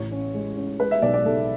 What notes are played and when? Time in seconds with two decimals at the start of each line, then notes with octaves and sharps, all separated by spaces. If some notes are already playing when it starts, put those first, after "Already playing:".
Already playing: A1 C#5
0.11 C#4
0.34 G#3
0.57 C#4
0.79 G#3 B4
0.91 E5
1.02 B1 D5
1.14 D5
1.25 B1 A4